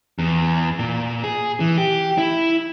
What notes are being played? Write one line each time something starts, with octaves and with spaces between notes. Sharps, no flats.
E2
A#2
G#4
E3
G4
E4